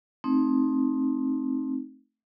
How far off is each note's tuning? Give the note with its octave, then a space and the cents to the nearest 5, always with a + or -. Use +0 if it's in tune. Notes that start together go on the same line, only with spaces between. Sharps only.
A3 +0 C4 +15 D#4 +0